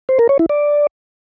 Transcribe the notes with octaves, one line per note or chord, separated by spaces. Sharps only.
C5
A#4
C#5
E4
D5